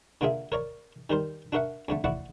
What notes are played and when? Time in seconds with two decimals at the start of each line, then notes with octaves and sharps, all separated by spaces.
0.21 D3 A#3 F4 G#4 E5
0.52 A#4 C#5 D5 A#5
1.10 D#3 G3 A#4 C5
1.52 D4 F#4 A#4 E5 F#5
1.88 F2 D3 A3
2.04 A1 E4 F#4 D5 F#5